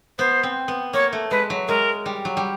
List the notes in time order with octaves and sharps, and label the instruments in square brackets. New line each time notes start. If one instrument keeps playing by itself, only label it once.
[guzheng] B3 [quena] C5
[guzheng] C4
B3
[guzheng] A#3 [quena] C#5
[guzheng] A3
[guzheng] G#3 [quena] B4
[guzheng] F#3
[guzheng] G#3 [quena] A#4
[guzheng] G3
F#3
G3